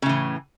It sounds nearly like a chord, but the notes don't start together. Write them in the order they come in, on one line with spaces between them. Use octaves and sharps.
C#3 A2 E3